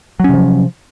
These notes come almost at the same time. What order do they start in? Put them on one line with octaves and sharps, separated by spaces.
F#3 C#4 C3 F3